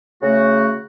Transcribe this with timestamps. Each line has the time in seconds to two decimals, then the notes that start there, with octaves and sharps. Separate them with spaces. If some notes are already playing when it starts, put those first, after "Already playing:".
0.22 C#3 A3 F#4